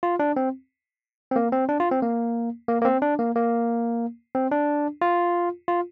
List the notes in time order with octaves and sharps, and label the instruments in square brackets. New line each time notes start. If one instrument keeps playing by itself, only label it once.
[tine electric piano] F4
D4
C4
C4
A#3
C4
D4
F4
C4
A#3
A#3
A#3
C4
D4
A#3
A#3
C4
D4
F4
F4